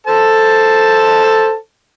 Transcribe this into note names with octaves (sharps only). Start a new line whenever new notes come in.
A4 C5 A5